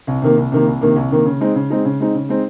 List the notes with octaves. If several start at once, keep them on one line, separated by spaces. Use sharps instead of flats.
C2
C3 D#3 A#3
C2
C3 D#3 A#3
C2
C3 D#3 A#3
C2
C3 D#3 A#3
C#3
G#3 C4 D#4
C#3
G#3 C4 D#4
C#3
G#3 C4 D#4
C#3
G#3 C4 D#4